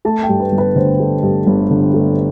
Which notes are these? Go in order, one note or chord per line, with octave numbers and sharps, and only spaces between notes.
A3 A5
G5
G2
B4
G1
B4
D3 C5
A3
G2
G1
D3
A3